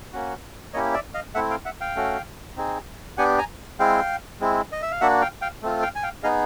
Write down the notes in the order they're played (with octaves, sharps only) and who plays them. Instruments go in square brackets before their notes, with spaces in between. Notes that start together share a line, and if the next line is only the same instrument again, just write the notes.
[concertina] A#3 C#4 F#4
A#3 C#4 E4 G4 C#5 D#5
D5 E5
D#5 F5
A3 C4 E4 E5 F#5
F5 G5
E5 F#5
F5 G5
A3 C#4 F#4
C4 D#4 G#4
B3 D4 G4 F#5 G#5
G#5 A#5
G#3 C4 E4 F5 G5
G#3 C4 E4
D#5
E5
F5
A#3 D4 F#4 E5 F#5
F5 G5
F5 G5
A3 C4 F4
F5 G5
G#5
F5 G5
B3 D#4 G#4 D#5 F5